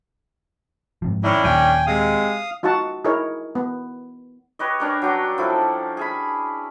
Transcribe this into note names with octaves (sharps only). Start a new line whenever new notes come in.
G#2 C3 F3
D#3 C#4 D4 E4
D#2 A#2 F#3 G5 G#5
C3 G#3 F5 D#6
D#4 F4 F#4 F#5 A5
D#4 E4 G#4 A#4 C#5
B3
G4 B4 C#5 D#5
C#4 D4 A#4
F#3 G5 A#5
F3 E4 A4
G#4 E5 B5